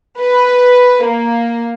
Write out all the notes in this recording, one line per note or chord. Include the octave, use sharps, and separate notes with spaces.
B4
A#3